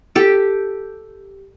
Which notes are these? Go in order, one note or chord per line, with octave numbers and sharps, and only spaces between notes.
G4 A4